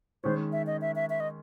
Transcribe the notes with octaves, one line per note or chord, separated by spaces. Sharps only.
D#3 G#3 C#4 C5
E5
D#5
E5
E5
E5
D#5